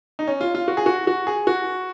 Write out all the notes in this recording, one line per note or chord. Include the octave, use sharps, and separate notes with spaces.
D#4
C#4
F4
F4
F#4
G#4
F#4
F#4
G#4
F#4